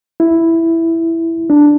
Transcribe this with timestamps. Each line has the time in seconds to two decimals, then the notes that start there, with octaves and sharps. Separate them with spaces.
0.20 E4
1.50 D4